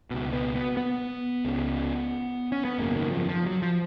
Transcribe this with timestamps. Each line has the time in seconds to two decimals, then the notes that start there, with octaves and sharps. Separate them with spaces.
0.11 C#2 B2
0.33 B3
0.55 B3
0.77 B3
1.45 C#2 C#3
2.52 C#4
2.65 B3
2.78 G#1 F#2 C#3 A#3
2.96 D#3
3.12 F3
3.29 F3
3.46 F#3
3.62 F3